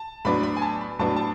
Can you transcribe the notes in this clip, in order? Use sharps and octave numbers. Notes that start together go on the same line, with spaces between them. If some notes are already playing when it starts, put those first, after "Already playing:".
Already playing: A5
A2 F#3 B3 D4 B5
B5
G#5
A5
B5
A2 F#3 B3 D4 A5
A5